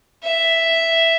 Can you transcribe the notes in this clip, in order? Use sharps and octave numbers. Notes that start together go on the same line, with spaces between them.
E5